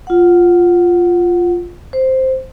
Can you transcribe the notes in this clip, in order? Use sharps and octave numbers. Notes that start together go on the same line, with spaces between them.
F4 F#5
C5